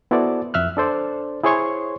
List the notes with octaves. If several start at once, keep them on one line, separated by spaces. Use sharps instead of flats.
B3 E4 F#4 A4 C5 D5
F2 E5 F6 F#6
D4 A4 C5 D5
E4 G#4 C5 C#5 C6 C#6